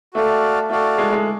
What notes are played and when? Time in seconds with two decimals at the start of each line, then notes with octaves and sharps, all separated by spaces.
0.14 A3 F#4 A4 D5 F5
0.70 A3 F#4 A4 D5 F5
0.98 G#3
1.13 G#3